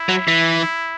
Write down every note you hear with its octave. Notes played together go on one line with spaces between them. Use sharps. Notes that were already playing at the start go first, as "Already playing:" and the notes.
Already playing: E4
F#3
E3